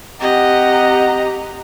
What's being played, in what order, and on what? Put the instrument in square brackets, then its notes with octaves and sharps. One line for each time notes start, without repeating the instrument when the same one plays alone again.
[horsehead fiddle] C4 A#5 [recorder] G4 [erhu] D#5 [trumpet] F#5